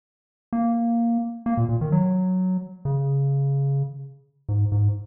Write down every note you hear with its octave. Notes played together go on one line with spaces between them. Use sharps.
A#3
A#3
A#2
A#2
D#3
F#3
C#3
G#2
G#2